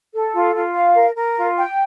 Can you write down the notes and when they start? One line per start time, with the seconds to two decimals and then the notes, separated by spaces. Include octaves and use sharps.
0.14 A4
0.35 F4
0.55 F4
0.75 F5
0.95 A#4
1.16 A#4
1.37 F4
1.57 G5